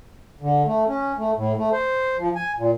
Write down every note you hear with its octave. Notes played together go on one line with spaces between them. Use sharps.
D3
A3
C#4
A3
A2
A3
C5
F3
G#5
A#2